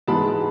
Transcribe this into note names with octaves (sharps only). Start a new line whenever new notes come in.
G#2 E3 G#3 B3 A5 B5